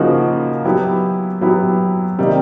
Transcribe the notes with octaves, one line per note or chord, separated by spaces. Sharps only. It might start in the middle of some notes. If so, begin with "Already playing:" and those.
Already playing: C#3 F3 A#3 D#4 F#4
F#3 B3 E4 G4
F#3 B3 E4 G4
C3 D#3 G3 A#3 D#4